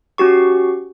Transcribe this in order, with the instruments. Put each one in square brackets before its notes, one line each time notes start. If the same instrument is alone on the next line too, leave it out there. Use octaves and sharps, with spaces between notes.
[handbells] C#4 F#4 G4 C#6